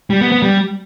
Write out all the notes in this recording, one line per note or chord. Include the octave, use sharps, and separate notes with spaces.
G3
B3
B3
G3